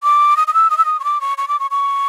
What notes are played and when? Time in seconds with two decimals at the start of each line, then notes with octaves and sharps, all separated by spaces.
0.03 D6
0.37 D#6
0.47 D#6
0.54 E6
0.70 D#6
0.78 E6
0.85 D#6
1.00 C#6
1.04 D6
1.21 C#6
1.38 C#6
1.48 D6
1.60 C#6
1.71 C#6